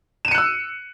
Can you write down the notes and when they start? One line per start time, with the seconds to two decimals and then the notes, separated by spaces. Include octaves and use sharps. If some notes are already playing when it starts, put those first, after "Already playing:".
0.25 E7
0.28 D#7
0.31 C#7
0.35 F#6
0.38 E6